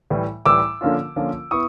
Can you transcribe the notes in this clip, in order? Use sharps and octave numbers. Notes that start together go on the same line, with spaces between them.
A2 E3 G3
A2 E3 G3 D6 E6
D3 F3 A#3 C#4 F4
D3 F3 A#3 C#4 F4
B3 E4 C#6 D#6